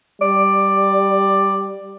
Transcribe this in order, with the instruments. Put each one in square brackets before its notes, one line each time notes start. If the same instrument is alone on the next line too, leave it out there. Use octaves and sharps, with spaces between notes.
[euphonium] G3 [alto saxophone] D5